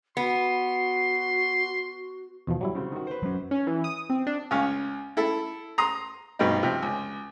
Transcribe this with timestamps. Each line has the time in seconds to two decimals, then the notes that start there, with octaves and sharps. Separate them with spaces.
0.17 B3 F#4 C6
2.47 E2 B2 F3
2.61 F#3 G3 E4
2.75 C#3 C4 F#4
2.92 D#3 F#4
3.07 B4 C5
3.23 F#3 C#4
3.51 C#4
3.67 E3
3.84 D#6
4.10 C4
4.27 D4
4.51 C#2 C#4 F5
5.17 E4 A4
5.78 A#5 C6 D#6
6.39 G2 B2 C4 D#4
6.63 C3 F3
6.83 C#2